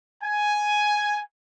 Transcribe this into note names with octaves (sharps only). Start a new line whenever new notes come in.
G#5